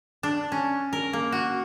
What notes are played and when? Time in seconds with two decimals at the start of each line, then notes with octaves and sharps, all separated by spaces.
0.23 D4
0.52 C#4
0.93 A#4
1.13 A#3
1.32 F#4